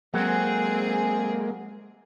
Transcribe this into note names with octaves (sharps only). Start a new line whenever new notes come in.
F#3 G#3 A#3 C4 G#4